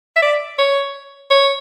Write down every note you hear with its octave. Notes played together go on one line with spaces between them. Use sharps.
E5
D5
C#5
C#5